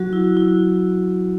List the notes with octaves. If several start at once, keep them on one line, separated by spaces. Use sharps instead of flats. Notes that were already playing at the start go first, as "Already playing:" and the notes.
Already playing: F#3 F#4
E4
E4